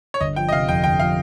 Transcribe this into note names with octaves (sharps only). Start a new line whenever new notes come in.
C#5
G1 D#5
F3 G5
D#5
C3 F5
F2 G5
G1 G5
F3 F5